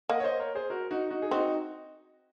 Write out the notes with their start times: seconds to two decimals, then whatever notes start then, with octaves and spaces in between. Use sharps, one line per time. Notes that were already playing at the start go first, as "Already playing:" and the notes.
0.09 A#3 D#5 F#5
0.20 C#5
0.24 C5 D#5
0.40 A#4 C#5
0.55 G#4 C5
0.70 F#4 A#4
0.91 D#4 F#4
1.10 D#4 F#4
1.22 G#4
1.31 C4 D#4 F#4